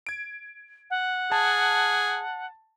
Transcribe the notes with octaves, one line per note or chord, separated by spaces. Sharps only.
G#6 D7
F#5
G#4 A5